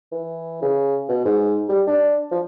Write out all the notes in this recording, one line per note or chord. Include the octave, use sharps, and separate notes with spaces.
E3
C#3
B2
G#2
G3
D4
F3